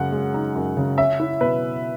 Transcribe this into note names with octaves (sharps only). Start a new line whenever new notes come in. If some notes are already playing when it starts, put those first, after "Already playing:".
Already playing: F#2 C#3 G#3 F#5
G#3
D#4
F#2
C#3
C#4 E5
E4
B2 B4